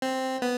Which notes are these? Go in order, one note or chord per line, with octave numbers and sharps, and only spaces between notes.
C4
B3